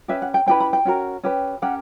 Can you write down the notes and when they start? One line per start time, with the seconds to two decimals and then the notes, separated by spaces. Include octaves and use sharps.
0.08 C#4 G4 B4 E5
0.22 F#5
0.34 G5
0.46 C#4 E4 G4 B4 G5
0.60 B5
0.73 G5
0.85 C#4 F#4 A#4
1.23 C#4 G4 B4
1.62 C#4 G4 A#4 F#5